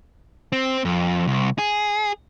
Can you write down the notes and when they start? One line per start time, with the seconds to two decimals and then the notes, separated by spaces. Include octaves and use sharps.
0.52 C4
0.85 F2
1.28 C2
1.58 G#4